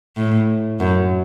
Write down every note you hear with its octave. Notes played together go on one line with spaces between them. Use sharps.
A2
F#2